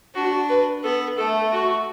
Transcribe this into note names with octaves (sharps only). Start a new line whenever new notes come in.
D4 F#4
B4
B3 A4
A3 A4
F#4